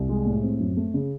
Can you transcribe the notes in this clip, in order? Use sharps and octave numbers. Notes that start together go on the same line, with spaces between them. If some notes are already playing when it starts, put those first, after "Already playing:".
Already playing: C2
G#3
A2
C4
F#2
A3
C#3